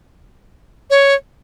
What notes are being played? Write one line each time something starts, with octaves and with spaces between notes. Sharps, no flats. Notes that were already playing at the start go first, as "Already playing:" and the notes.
C#5